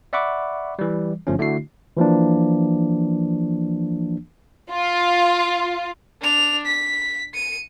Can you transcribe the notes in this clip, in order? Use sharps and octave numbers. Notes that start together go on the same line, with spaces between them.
D5 E5 F#5 B5 C#6 D6
E3 G3
G1 F3 A3 C#4
D3 A3 D4 E4 F#4 C7
E3 F3 A#3 D4
F4
D4 F7
B6
C#7 D#7